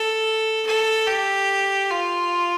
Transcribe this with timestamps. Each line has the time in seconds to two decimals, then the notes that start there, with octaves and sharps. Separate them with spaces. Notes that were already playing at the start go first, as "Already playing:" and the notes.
Already playing: A4
0.67 A4
1.08 G4
1.90 F4